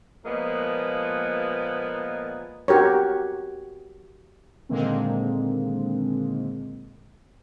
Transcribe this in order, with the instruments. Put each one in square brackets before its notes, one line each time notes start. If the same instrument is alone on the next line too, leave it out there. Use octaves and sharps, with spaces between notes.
[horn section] A#2 F3 G#3 A#3 B3
[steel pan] F#4 G4 A#4 C#5
[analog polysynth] A#2 D3 D#3 G#3 A#3 C4